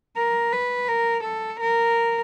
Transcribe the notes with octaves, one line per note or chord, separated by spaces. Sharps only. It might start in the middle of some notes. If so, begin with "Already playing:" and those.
A#4
B4
A#4
A4
A#4